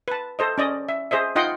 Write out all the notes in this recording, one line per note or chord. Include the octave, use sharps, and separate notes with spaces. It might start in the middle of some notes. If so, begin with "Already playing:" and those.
B4 A5
A4 C5 D#5
C#4 D5 D#5
E5
G#4 C5 D#5 E5
D#4 F4 D#5 F#5 G5 C6